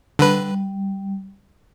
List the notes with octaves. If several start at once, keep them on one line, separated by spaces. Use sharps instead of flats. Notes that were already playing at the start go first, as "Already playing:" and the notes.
D3 G3 B4